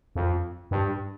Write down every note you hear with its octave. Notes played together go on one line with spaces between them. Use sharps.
F2
G2